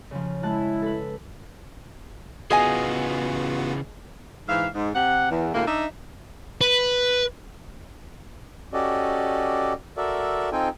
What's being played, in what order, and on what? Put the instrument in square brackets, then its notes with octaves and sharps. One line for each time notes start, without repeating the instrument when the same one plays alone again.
[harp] C#3 F3
[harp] G#3 A5 F#6 [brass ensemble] E4
[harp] A4 B4
[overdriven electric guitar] C#3 E3 [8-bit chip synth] B3 F4 F#4 [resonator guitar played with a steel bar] G#4 D#5 G#5
[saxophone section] G#2 E3 E5 F5
G#2
C3 G4 F#5
E2
D2 A2 G#3 A#3
D4 D#4 D#5 E5
[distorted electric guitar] B4
[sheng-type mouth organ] C#4 F#4 G4 A4 D5 D#5
F#4 A4 A#4 D5 E5
C4 D#4 F4 A4 G5 G#5